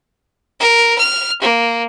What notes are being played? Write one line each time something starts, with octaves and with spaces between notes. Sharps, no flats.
A#4
F6
A#3